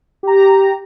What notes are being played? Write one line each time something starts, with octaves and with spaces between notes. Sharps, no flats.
G4 A#5